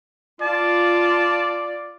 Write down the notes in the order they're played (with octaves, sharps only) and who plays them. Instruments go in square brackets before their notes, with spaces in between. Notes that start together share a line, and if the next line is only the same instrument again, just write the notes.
[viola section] F4 [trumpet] D5 [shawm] A5